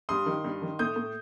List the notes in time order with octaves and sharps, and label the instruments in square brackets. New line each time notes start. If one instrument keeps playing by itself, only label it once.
[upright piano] G2 C6 D#6
D#3
G2
D#3
A2 D#6 G6
A2